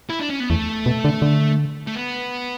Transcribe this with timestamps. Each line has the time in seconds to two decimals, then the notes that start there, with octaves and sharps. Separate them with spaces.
0.10 E4
0.19 D4
0.30 C#4
0.40 B3
0.50 E2 A3
0.86 B2
1.04 D3
1.22 D3
1.87 A3
1.95 B3